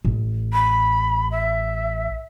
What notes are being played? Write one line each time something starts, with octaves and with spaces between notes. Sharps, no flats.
A1
B5
E5